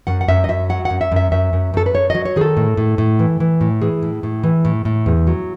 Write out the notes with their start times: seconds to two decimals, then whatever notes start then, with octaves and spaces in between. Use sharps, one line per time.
0.07 F#2 F#5
0.21 F#5
0.28 F#2 E5
0.44 D#5
0.49 F#2 E5
0.70 F#3 F#5
0.85 F#2 F#5
1.01 E5
1.12 F#2 E5
1.32 F#2 E5
1.53 F#2
1.74 F#2 A4
1.86 B4
1.94 F#2 C#5
2.10 F#3 D#5
2.25 C#5
2.36 D#3 G#4
2.41 A4
2.57 A2
2.77 A2
2.98 A2
3.19 E3
3.40 E3
3.61 A2
3.81 E3 G#4
4.03 A2
4.23 A2
4.44 E3
4.65 A2
4.85 A2
5.06 E2
5.27 F#3